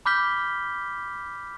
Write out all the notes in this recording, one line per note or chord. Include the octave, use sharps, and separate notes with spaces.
B5 D6 F6 G6 B6 G7